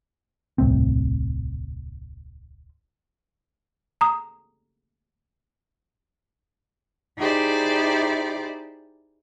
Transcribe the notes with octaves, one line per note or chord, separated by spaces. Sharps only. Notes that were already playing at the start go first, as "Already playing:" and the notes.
D#1 C2 A2 C4
A#5 D#6
D#4 E4 G4 G#4 C5 D5